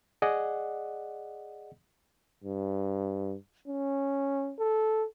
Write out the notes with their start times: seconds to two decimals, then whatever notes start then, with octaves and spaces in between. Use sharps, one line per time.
0.22 G#4 D5 D#5 F#5
2.44 G2
3.68 C#4
4.59 A4